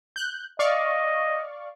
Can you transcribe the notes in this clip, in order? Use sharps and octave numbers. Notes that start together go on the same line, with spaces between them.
F#6 G6
D5 D#5 F5 C#6